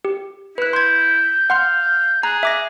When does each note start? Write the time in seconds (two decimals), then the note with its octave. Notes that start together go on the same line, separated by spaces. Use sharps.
0.05 G4
0.58 E4 B4 F#6
0.73 C6 G6 G#6
1.50 F5 F#5 C6 F6
2.23 G#4 A#5 F#6
2.43 E5 D6 A#6